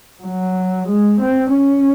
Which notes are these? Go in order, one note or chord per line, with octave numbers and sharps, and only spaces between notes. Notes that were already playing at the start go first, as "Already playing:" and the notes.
F#3
G#3
C4
C#4